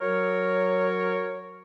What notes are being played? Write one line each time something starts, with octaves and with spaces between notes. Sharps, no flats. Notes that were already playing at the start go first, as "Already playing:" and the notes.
F#3 A#4 C#5